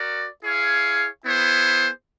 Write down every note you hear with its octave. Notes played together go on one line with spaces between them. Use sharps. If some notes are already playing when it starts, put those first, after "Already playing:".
Already playing: F#4 A#4 D5
E4 G#4 C#5 F5
B3 E4 G#4 C5